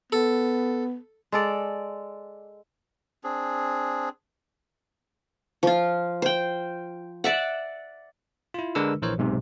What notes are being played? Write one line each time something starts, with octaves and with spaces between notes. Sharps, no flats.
B3 A4
G#3 A4 D5
C4 D4 G#4
F3 F4
C5 G5
D5 E5 F#5
E4 F4
D3 G#3 D4 A#4 B4 E6
A#1 E3 A#4 C5 C#5
B1 G#2 C3